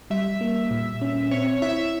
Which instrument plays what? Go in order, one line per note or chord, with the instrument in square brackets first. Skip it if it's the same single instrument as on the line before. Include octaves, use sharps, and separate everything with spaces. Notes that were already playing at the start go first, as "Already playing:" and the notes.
[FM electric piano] G3 [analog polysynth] E5
[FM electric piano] A#3
A#2
C#4
[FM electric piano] C4 [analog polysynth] C#5
[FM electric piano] E4 [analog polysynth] E5